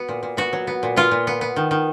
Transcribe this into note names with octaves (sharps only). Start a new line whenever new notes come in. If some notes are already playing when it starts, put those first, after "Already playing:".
Already playing: B3 F#4
A#2
A#2
B3 F#4
F#3
B3
A#2
B3 F4
A#2
B3
B3
D#3
D#3